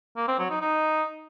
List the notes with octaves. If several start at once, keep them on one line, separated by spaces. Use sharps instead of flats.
A#3
C4
F#3
D#4
D#4